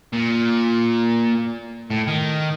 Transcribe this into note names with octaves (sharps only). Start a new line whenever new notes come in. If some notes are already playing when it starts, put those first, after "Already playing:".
A#2
A2
D#3